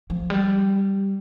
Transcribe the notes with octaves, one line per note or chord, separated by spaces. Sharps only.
F3
G3